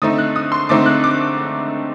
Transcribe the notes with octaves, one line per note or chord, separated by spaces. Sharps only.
D3 A3 C4 D#4 D#6
F#6
D#6
C6
D3 A3 C4 D#4 D6
F#6
D6